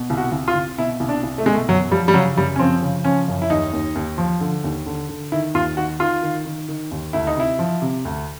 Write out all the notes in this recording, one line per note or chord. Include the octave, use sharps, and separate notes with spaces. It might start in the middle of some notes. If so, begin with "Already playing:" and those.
Already playing: B2
C2
F#4
C2
F4
C2
B2 E4
C2
D4
C2
A3
B2 G#3
A3
F#2 F#3
F3 G3
G3
C#3 F#3
F#2 G3
C#4
F3 C4
C#3
F3 C#4
F#2
E4
D#2 D#4
D#2
D#2
F3
D3
D#2
D3
D3
D#3 E4
D#2 F4
D#3 F#4
D#3 F4
D#3
D#3
D#3
D#2
D2 E4
D#4
C3 E4
F3
C3
D2